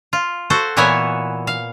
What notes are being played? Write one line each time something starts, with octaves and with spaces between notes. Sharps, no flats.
F4
F#4 A4 C5
A#2 E3 B3 C#5 E5 G#5
F5